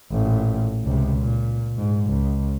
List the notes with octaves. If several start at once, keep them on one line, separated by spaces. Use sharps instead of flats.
A1 A#2
C#2 C3
A#2
G#2
C#2